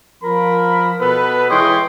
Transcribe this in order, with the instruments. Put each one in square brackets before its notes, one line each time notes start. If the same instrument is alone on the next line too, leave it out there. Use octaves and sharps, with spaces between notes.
[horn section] F3 A#4 B5
B2 B3 A4 B4
E3 G#3 C#5 D#5 G5 C6